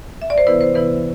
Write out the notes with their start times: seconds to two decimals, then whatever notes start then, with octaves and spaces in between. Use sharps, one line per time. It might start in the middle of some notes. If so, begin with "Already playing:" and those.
0.22 E5
0.30 D5
0.38 C5
0.47 C3 E3 B3 E4 B4
0.61 C5
0.75 C3 E3 B3 E4 B4